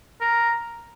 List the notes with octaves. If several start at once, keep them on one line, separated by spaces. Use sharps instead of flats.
A#4